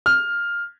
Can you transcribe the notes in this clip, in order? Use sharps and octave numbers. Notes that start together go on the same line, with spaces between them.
F6